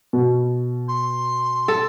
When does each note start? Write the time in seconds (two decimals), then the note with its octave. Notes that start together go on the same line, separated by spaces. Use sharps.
0.13 B2
0.88 C6
1.68 A4